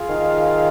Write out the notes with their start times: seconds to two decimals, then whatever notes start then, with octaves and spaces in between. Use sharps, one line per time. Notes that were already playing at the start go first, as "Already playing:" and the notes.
Already playing: F4 G#4 F5
0.09 D#3